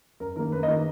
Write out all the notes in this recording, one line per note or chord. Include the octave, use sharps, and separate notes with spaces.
F#2 A#4
D#3 A#3 A#4
F#2 B4
D#5
D#3 A#3